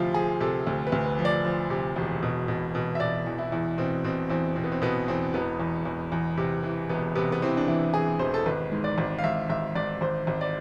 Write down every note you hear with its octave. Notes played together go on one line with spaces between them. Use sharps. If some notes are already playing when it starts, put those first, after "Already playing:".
Already playing: D2 C3 F3 E4 F4
F3 G#4
C3 A4
D2
B4
D2
B4
F3
D5
F3
C3
E1
B2
B2
B2
E5
B2 D5
E2
E4
E2
B2 C4
B2 C4
E2 C4
B2 C4
B3
C4
B2 B3
E2 C4
E1 B3
E2
E2
E2
C3
E3
E1 B3
C3 B3
B3
E3 C4
D4
E3 E4
E3 G#4
E1 C5
A4
G#1 B4
G#2
D5
G#1
F5
G#1 E5
G#1 E5
G#1 D5
G#1 C5
G#1
D5